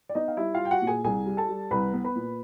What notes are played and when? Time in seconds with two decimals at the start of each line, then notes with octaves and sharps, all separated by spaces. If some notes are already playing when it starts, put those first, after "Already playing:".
0.09 D5
0.15 B3 D#4 D#5
0.28 F5
0.37 G3 E4 E5
0.54 F4 F5
0.60 G3
0.65 G5
0.71 F#4 F#5
0.82 A#2
0.87 G#4 G#5
1.04 C2 G#4 G#5
1.26 G3
1.37 A4 A5
1.49 G3
1.71 C2 B4 B5
1.94 B3
2.04 B4 B5
2.16 A#2